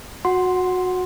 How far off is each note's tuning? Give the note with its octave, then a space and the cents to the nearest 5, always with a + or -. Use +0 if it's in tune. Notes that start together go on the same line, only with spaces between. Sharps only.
F#4 -20 F#5 +0 C6 +0